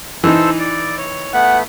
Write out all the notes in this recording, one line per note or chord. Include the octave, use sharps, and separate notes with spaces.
E3 D#4 A4 C5 E6
D5
C#5
A3 B3 F#5